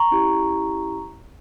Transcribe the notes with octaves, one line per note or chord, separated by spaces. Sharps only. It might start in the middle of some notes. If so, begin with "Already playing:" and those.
Already playing: A#5 C#6
C#4 E4 G4